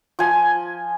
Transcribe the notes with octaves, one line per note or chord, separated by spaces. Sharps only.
F3 G#5